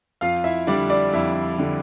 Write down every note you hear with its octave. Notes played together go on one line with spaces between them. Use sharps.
F2 F4 F5
E4 E5
D3 G3 D4 D5
D4 D5
F2 E4 E5
D3 G3